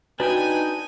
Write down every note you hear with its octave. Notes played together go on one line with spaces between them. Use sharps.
D4 D#4 F#4 B4 G5 G#5